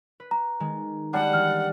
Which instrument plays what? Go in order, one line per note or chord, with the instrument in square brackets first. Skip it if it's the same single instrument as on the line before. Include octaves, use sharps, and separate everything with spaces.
[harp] B4
[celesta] A#5
[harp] D#3 G#3
[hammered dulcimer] G3 D4 [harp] G#3 A#3 [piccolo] F#5
[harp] E3 [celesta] F6